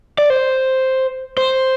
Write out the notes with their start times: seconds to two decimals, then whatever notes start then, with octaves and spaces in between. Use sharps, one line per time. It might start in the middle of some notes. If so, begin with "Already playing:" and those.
0.18 D5
0.30 C5
1.37 C5